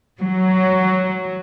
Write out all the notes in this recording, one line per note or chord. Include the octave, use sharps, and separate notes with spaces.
F#3